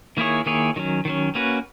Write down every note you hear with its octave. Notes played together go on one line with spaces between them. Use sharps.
D#3 A#3 E4 G#4 C#5
D#3 A#3 E4 G#4 C#5
D#3 F#3 C#4
D#3 F#3 C#4
A#3 C#4 F#4 B4